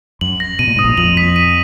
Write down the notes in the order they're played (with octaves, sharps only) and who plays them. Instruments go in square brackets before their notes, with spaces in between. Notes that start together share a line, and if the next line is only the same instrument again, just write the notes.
[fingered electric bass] F#2 [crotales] F#7
[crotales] A#6
[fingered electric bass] B2 [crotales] D#7
[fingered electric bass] A#2
[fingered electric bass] G#2 [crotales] D#6
[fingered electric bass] A#1 A#2
[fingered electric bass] F2 F3 [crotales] F#7
[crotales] B6
D#7